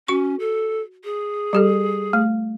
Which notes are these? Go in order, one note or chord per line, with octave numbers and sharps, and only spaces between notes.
C#4 F#4 C#6
A4
G#4
G3 G4 A4
A3